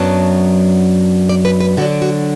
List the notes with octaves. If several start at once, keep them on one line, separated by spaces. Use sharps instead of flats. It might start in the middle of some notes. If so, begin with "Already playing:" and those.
Already playing: F#2 F#3 B3 D4 A5
D5
B4
B4
D3 F#3 D4 F#4
F#4